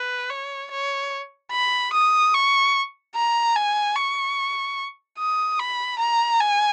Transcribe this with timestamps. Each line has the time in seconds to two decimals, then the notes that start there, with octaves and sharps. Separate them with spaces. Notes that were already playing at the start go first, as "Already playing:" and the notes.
Already playing: B4
0.30 C#5
0.71 C#5
1.52 B5
1.93 D#6
2.34 C#6
3.15 A#5
3.56 G#5
3.96 C#6
5.19 D#6
5.59 B5
5.99 A#5
6.41 G#5